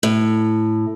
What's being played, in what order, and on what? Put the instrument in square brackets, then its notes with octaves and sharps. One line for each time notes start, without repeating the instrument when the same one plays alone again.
[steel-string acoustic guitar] A2